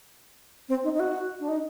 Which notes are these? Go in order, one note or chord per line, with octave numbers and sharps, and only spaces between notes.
C4
D#4
D#4
F#4
D4
D#4